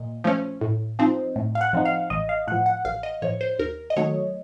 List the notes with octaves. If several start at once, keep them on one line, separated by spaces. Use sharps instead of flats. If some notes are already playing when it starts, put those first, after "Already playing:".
Already playing: A#2 D#5
F3 A3 C#4
A2
F3 C4 D#4
A2
F5
F#5
F3 C4 D#4
F5
A1 D#5
F5
A2 F3 F#5
F#5
A1 F5
D#5
A2 F3 C#5
C5
D#2 A#4
D#5
D#3 F#3 A3 C#5